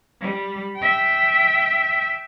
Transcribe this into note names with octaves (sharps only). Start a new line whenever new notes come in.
G3
E5 G5